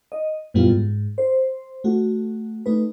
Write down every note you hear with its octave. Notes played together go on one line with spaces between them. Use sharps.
D#5
F#2 A#2 E3 G3 B3 F4
G#2
C5
A3 F#4
A3 D#4 B4